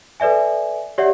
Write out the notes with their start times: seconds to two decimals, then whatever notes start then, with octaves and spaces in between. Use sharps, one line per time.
0.20 A4 B4 D5 E5 G#5
0.98 G4 C#5 D5 E5 F#5